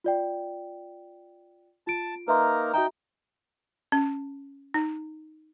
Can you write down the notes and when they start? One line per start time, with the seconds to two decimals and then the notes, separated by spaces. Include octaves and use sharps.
0.04 F4 D5 G5
1.87 F4 A5 D7
2.28 A#3 D#4 A#4 B4 E5 C6
2.74 D#4 F#4 E5 G5 A#5
3.92 C#4
4.74 D#4